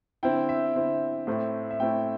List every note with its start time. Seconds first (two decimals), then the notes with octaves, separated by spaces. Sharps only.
0.23 D3 C4 E4 G5
0.49 E5
0.75 D3 C4 E4
1.27 A2 A3 C4 E4
1.70 E5
1.79 A2 A3 C4 E4 G5